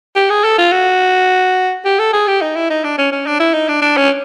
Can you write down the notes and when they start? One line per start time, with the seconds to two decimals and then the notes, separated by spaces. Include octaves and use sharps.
0.16 G4
0.30 G#4
0.44 A4
0.58 F4
0.72 F#4
1.85 G4
1.99 A4
2.13 G#4
2.27 G4
2.41 D#4
2.56 E4
2.70 D#4
2.84 D4
2.98 C#4
3.12 C#4
3.26 D4
3.39 E4
3.54 D#4
3.68 D4
3.82 D4
3.97 C#4